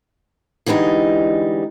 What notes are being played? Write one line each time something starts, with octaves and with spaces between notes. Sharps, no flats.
D3 E3 G3 G#3 D#4